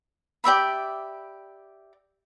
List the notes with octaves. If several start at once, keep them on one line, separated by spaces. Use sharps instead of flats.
G4 D5 E5 B5